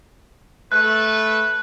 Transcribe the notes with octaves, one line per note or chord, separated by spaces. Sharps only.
A3 B4 F#6